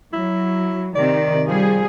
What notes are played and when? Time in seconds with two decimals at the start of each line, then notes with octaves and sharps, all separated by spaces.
0.13 F#3 E4
0.95 C3 D#3 D5
1.48 F3 G3 G#4